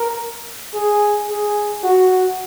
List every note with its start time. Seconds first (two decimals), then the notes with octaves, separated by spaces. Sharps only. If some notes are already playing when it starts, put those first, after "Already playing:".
Already playing: A#4
0.74 G#4
1.29 G#4
1.83 F#4